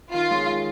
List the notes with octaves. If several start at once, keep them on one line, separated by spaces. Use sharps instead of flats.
D#3 F4
G#3 C#4 G#4
D#3